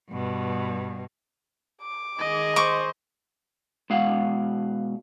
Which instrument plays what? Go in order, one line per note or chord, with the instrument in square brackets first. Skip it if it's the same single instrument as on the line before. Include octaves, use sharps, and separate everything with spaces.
[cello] G2 B2
[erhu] D6
[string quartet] D#3 G#3 G#4 [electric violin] D#5
[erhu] C5 [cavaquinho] C#6 D6
[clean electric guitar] B2 G#3 F5 F#5